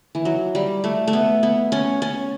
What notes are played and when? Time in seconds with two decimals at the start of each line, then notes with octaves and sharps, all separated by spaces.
0.15 E3
0.25 F#3
0.55 G3
0.84 A3
1.08 A3
1.13 B3
1.43 B3
1.72 C#4
2.02 C#4